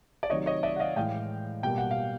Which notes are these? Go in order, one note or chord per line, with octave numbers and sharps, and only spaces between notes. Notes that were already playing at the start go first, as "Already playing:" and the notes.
D5
C3 D#3 F#3 C#5 D#5
C#5 D#5
D5 E5
F#5
D#5 F5
A2 E3 G#3 F5 G5
B2 G3 A#3 G5
F#5
F5